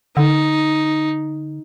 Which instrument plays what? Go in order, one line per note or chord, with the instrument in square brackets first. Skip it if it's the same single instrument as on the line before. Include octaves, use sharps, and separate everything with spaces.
[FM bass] D3 [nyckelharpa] D#4